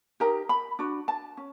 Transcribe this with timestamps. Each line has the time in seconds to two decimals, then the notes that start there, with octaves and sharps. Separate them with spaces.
0.20 D#4 G4 A#4 A#5
0.49 B5
0.79 D4 F#4
1.08 A5
1.37 C#4